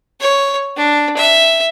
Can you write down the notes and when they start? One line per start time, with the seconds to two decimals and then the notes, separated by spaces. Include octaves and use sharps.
0.21 C#5
0.77 D4
1.17 E5